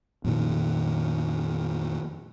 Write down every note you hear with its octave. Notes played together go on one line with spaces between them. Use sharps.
F2 A#2 D#3